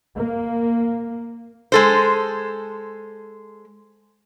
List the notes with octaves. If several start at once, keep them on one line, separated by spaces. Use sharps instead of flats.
A#3
G#3 A4 C5